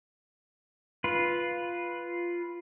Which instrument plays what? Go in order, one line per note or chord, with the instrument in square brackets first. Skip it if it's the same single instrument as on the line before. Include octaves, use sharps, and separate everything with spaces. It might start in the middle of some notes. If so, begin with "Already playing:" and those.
[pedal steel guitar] F4 B4